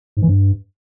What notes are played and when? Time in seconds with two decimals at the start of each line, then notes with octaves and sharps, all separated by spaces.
0.17 G#2
0.22 E3
0.28 G2